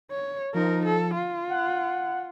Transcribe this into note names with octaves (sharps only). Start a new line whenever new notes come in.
C#5
F3 D#4 A#4
A4
F4
F#5